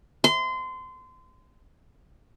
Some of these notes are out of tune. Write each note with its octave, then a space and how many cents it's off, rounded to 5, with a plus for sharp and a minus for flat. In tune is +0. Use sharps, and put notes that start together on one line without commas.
C6 -25